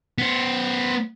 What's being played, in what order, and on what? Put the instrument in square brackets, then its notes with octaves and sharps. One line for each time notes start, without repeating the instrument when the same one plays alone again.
[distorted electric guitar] B3 C5